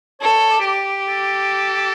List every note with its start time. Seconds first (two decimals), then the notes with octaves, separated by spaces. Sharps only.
0.21 A4 C#5
0.51 D5
0.64 G4
1.08 A4